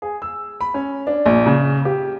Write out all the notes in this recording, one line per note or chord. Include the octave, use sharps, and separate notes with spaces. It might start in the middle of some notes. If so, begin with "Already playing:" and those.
G#4
E6
B5
C#4
D4
A#1
C#3
G4